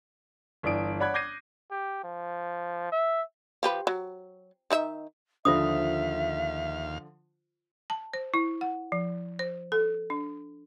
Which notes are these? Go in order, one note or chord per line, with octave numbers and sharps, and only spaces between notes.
G1 E3 D5 D#6 D7
C#5 D5 F#5 B5 F#6 G#6
D6 G6 G#6 A#6 C7 D#7
G4
F3
E5
F3 G4 B4
F#3
D#3 D#4 E5
D#2 D3 F3 F4 C5 E5 F5 D#6
A5
C5
E4
F#5
F3
C5
A4
D4